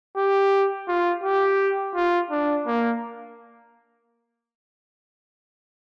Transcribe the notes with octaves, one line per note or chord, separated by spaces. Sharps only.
G4
F4
G4
F4
D4
A#3